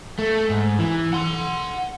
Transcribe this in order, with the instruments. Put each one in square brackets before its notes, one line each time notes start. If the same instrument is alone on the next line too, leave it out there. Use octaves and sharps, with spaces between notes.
[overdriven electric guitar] A3
G#2
E3
F#5 C6